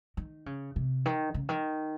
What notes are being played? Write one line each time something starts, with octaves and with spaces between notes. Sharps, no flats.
D#3
C#3
C3
D#3
C#3
D#3